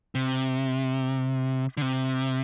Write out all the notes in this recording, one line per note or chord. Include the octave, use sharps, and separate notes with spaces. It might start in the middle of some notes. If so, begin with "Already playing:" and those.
C3
D3
C3